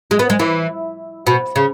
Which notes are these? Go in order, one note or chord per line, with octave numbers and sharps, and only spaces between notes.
G#3
B3
G#3
E3
B2
C#3